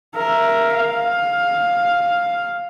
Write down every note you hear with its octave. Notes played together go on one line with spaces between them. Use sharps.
A#4 E5
F5